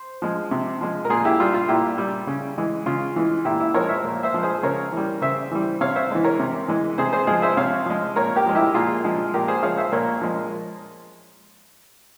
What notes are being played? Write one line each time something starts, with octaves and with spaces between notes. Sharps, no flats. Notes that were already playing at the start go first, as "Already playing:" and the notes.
Already playing: C5
F3 G#3
C3
F3 G#3
A#4
A#2 F4 G#4
E4 G4
G3 F4
F4
A#2 E4 G4
G3
C#3
E3 G#3
C#3 F4
E3 G#3
A#2 E4 G4
E4
F3 G#3 A#4 C#5
C5 E5
A#2
C5 E5
F3 G#3
G#4 C5
C#3 A#4 C#5
E3 G3
C#3 C5 E5
E3 G3
C3 C#5 F5
C5 E5
E3 G#3
A#4 C#5
C3
E3 G#3
C3 G#4 C5
G#4 C5
F3 G#3 F4 G#4
C5 E5
C3 C#5 F5
F3 G#3
A#2 A#4 C#5
G4 A#4
F3 G#3
E4 G4
A#2 F4 G#4
F3 G#3
A#2 G4 A#4
G#4 C5
F3 G#3 C#5 F5
C5 E5
A#2 A#4 C#5
F3 G#3